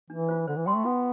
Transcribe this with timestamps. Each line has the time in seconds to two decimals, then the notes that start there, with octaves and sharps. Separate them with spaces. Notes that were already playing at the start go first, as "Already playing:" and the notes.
0.10 E3 D4
0.29 F4 C5
0.47 D3 C5
0.56 E3
0.66 G3 G5 C6
0.75 A3
0.84 B3 F4